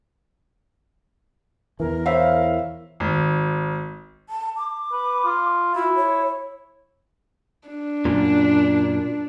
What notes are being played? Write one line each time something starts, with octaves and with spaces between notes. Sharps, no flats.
E2 E3 A#4
E4 C5 C#5 E5 F5
G#1
A5
D6
B4
F4
E4 F#4
C#5
D4
F#2 A#2